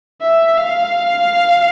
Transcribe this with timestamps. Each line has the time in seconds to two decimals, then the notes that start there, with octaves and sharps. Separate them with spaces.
0.22 E5
0.57 F5